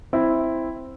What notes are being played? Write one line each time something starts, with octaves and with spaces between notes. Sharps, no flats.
C4 E4